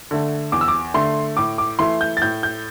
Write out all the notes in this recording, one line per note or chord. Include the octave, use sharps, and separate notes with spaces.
D3 A3
E2 D6
E6
D6
D3 A3 C6
A2 D6
D6
E3 A3 C6
G6
A6
A2 G6
G6